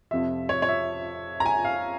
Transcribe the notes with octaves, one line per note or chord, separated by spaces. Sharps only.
F2 C3 F3 E5
C#5
C#5
E5
A#5
G#5
F5